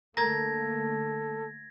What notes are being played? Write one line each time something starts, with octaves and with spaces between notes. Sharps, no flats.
D3 A3 A#3 A4 A#4 A#5 G#6 A#6